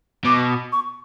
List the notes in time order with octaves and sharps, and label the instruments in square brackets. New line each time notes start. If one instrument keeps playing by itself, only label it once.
[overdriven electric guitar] B2 [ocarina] D6
[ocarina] C#6